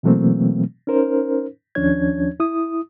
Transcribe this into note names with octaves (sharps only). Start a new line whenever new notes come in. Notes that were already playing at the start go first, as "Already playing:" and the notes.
B2 E3 F#3 A3 A#3 C4
C#4 D#4 A#4 C5
D#2 F3 C#4 D4 C#5 G#6
E4 D#6